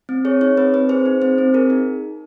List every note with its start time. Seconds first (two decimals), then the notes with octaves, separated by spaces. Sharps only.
0.09 C4
0.25 G#4 C#5
0.41 D#4 C#5
0.57 C4 B4
0.74 C4 B4
0.89 G#4 C5
1.06 D#4
1.22 C4 C5
1.38 C4
1.54 G#4 A#4
1.70 D#4